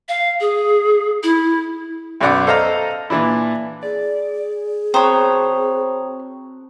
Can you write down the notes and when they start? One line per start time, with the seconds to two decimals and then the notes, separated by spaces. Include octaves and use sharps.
0.09 F5
0.40 G#4
1.23 E4
2.21 B1 F#2 B3 D5 F#5 D6
2.47 A4 C5 D#5 F5 A5 A#5
3.10 A#2 E3 D4 E4
3.83 G#4 D5
4.94 C4 F#4 C5 C#5 G5 A5 A#5 D#6